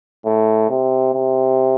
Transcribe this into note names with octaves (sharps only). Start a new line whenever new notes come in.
A2
C3
C3